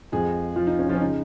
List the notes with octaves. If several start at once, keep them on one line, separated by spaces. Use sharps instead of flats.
F2 F3 G#3 G#4
F3 F4
D#4
C#4
F3 F4
C#4
C#3 G#3 D#4